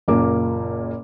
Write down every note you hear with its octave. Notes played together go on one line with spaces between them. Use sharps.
F#1 A#2 A#3 D6